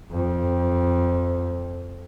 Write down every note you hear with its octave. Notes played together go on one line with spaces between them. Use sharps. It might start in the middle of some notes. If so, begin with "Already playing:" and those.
F2